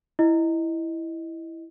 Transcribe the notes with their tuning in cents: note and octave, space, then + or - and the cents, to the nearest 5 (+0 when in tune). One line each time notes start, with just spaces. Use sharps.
E4 +0 D#5 +0